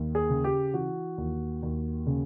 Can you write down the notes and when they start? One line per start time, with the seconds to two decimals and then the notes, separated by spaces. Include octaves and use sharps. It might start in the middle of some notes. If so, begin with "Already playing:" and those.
Already playing: D#2
0.15 G#4
0.29 C#3
0.44 G4
0.74 E3 F#4
1.18 D#2
1.63 D#2
2.07 C#3